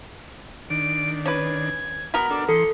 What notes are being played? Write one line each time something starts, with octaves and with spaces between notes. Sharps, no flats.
D#3 D4 D7
C#4 B4 G#6
B2 B3 A#4 B5
D4 A4 D6
E3 A4 C6 C#7